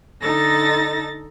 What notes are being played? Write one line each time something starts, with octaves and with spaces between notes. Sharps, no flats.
D3 D#4 A4 A6 A#6